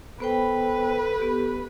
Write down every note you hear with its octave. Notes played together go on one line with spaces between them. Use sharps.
B3 A4 B4 C5 G5
B3 G4